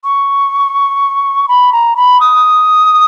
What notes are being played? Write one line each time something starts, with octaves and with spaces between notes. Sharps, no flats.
C#6
B5
A#5
B5
D#6